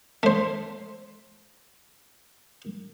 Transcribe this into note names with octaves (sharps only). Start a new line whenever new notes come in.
A3 C5